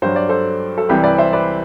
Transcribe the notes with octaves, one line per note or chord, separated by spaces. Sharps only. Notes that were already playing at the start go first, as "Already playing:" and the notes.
G2 F#3 C5
D5
A4 C5
A4
C2 C3 E3 G3 G4 B4
B4 D5
C5 E5
B4 D5